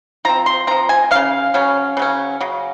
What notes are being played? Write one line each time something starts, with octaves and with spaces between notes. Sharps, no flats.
F3 C4 A#5
C6
F3 C4 A#5
G#5
C#3 F#3 C#4 F5
C#3 F#3 C#4
C#3 F#3 C#4
C#3 F#3